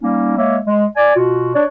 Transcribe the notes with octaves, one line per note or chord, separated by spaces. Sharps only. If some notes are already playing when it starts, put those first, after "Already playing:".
G3 A#3 C#4 D#4
G#3 A#3 C#5 E5
G#3
D5 G#5
B2 F4 F#4
D4 C#5 D5